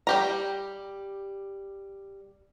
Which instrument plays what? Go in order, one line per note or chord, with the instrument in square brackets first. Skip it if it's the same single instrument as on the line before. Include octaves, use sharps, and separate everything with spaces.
[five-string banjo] G3 G4 A#5